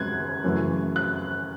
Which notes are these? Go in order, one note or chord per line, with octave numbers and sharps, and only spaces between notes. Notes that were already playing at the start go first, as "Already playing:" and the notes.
Already playing: F#2 C#3 G#3 F#6 G#6
F#2 C#3 E3 A3
F#6